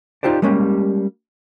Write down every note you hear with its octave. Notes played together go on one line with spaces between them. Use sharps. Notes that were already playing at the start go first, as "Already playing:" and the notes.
D#4 F4 G4 C5 D5
G3 G#3 A#3 C#4 G4